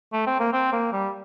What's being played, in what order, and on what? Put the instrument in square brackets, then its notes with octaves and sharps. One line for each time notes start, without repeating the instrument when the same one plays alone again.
[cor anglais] A3
C4
A#3
C4
A#3
G3